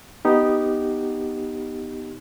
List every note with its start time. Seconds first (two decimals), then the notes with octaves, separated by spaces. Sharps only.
0.25 B3 D#4 G4